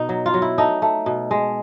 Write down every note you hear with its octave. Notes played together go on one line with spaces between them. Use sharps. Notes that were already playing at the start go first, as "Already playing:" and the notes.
Already playing: B2 D#4
F#3
F4
F#3
E4
A3 D#4
A3
B2
G#3